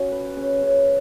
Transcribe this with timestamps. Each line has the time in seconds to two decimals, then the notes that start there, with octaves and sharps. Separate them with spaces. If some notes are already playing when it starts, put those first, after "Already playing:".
Already playing: C#4 F#4
0.12 B4
0.37 C#3
0.63 C#3